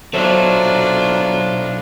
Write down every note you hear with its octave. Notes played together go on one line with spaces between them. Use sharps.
B1 F#3 D4 F4 A4 C5 C#5 E5